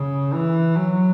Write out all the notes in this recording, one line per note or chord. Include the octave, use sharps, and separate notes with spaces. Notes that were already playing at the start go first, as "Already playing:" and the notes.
Already playing: C#3
E3
F#3